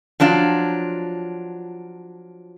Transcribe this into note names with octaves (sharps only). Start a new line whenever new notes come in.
F3 F#3 D4 F4